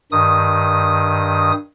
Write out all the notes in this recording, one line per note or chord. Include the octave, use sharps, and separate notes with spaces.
G2 D#3 D#6